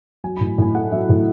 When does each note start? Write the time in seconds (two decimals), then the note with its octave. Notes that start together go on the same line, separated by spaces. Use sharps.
0.24 F#3 G#5
0.37 A2 B5
0.58 A2 G#5
0.75 A3 F#5
0.92 F#3 E5
1.09 A2 A4